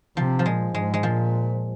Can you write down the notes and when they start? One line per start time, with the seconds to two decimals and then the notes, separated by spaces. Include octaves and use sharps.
0.17 C3 F3
0.39 F3
0.46 A#2 G#3
0.74 G#2 G#3
0.94 G#3
1.03 A#2 F3